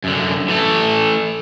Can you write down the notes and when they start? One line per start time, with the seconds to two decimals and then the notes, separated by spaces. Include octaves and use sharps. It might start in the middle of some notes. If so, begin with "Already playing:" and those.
0.04 F#2 D3
0.48 E3 A3 A4